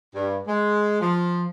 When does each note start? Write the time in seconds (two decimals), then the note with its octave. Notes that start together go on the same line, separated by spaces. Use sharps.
0.14 G2
0.47 G#3
1.01 F3